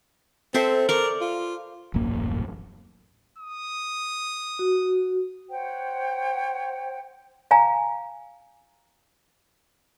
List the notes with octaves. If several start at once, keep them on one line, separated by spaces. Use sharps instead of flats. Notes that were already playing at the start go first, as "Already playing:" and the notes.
C4 A4 C5 E5
A#4 D5 C#6
F4
D#1 A1 F#2 A#3
D#6
F#4
C5 C#5 F#5 G5
F5 G#5 A#5